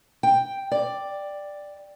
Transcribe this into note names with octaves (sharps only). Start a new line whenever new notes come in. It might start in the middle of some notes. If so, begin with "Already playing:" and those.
G5
D5